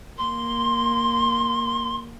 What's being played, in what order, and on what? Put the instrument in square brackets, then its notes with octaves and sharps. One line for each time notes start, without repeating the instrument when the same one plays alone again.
[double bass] A#3 [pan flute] C6